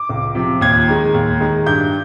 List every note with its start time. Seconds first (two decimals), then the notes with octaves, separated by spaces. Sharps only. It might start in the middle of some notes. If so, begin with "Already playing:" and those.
Already playing: D6
0.09 C#2
0.35 C3 F3
0.61 D#2 G#6
0.88 D#3 G#3
1.14 D#2
1.40 D#3 G#3
1.66 G2 G6